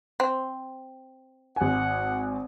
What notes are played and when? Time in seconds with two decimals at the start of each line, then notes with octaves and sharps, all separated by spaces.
0.20 C4
1.56 G#1 F#5 G#5